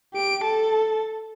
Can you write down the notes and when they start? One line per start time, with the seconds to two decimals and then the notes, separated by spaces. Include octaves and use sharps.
0.13 G4 D7
0.44 A4 A5